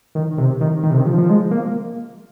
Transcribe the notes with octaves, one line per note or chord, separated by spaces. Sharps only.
D#3
C3
D#3
D#3
C3
D#3
F3
F3
G#3
A#3